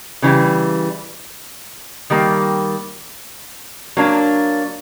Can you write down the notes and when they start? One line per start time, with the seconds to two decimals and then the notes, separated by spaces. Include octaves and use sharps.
0.22 C#3 E3 G3
2.10 D#3 G3 A#3
3.97 F#3 A#3 D4